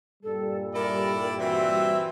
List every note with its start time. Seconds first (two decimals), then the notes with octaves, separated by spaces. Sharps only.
0.23 G2 A#2 G3 A4
0.74 E4 A4 A#4 D5
1.39 E3 C4 F#4 E5